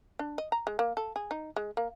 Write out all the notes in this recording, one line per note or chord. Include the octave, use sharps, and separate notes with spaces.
D4
D#5
A#5
G#3
A#3
A4
G#4
D#4
G#3
A#3